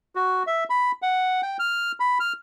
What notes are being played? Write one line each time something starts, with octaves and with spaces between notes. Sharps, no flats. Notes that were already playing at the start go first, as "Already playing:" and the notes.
F#4
E5
B5
F#5
G5
F6
B5
F6